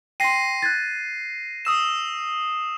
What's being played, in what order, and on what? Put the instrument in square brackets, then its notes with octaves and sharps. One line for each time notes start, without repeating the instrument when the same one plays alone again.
[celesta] G5 C6 [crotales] A#6 C7 D#7
[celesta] F#6 G#6 A6
[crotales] D#6 E6 E7